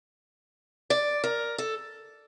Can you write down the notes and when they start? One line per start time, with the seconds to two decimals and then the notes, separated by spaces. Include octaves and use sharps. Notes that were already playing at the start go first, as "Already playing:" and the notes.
0.90 D5
1.24 A#4
1.58 A4